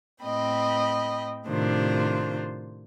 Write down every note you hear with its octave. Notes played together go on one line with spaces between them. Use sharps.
A2 C4 D#5 G5 B5
A2 C3 D#3 D4 F4 C5